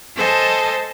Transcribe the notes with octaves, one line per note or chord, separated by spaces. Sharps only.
A4 C5 D#5 G#5 A5